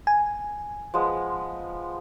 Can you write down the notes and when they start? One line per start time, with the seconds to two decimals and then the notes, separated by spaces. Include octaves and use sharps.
0.07 G#5
0.94 F3 G#3 B3